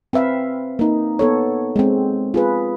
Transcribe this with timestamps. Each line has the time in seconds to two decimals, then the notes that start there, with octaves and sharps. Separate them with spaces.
0.13 C4 B4 E5 F5
0.79 A#3 D#4
1.19 B3 A4 C#5
1.76 G#3 C4
2.34 F4 G#4 B4